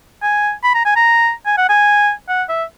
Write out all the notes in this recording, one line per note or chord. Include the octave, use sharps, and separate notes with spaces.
G#5
B5
A#5
G#5
A#5
G#5
F#5
G#5
F#5
E5